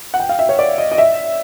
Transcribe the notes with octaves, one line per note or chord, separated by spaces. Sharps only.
F#5
G5
F5
E5
C#5
D5
D#5
D#5
E5